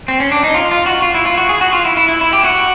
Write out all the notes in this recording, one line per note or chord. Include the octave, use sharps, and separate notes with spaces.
C4
C#4
D4
D#4
F4
F4
F#4
F4
E4
F4
F#4
G#4
F#4
F4
E4
E4
E4
E4
G4
F#4